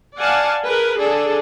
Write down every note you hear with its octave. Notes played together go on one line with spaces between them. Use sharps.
D5 F5 F#5 G#5 A5
G#4 A#4 B4
D4 G#4 A4